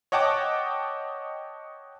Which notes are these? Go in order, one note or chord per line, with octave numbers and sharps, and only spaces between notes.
C#5 D#5 F#5 G5 A5 D6